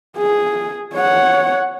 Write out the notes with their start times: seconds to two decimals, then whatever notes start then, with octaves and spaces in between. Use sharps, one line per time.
0.17 G#4
0.95 C#5 F#5